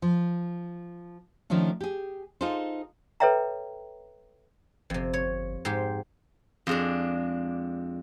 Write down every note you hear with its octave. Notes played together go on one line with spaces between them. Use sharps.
F3
D#3 F3 A3 C#4 D4
G4 G#4
D#4 F4 G#4 A4 C5
A4 B4 C#5 E5 G5 A#5
G1 F2 C3
C#5
G#2 G4 C6
F2 G#3 D4